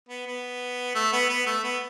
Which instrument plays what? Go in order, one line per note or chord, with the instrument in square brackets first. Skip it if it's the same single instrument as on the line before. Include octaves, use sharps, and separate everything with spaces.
[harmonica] B3
B3
A3
B3
B3
A3
B3